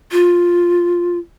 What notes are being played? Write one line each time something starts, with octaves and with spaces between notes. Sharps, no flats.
F4